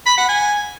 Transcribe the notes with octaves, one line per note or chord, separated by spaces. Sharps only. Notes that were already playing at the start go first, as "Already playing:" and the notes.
B5
F#5
G#5